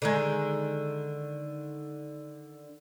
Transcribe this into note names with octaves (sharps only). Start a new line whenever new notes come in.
D3 D#3 G#3